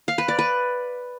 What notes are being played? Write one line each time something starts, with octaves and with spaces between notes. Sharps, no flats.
F5
B4
D5
B4